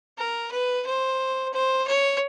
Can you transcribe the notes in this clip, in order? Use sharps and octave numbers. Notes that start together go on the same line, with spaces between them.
A#4
B4
C5
C5
C#5